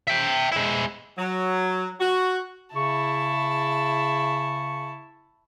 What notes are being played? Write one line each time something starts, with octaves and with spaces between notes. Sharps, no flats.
E5 G5
G#3 E4
F#3
F#4
C#3 E4 A5 C#6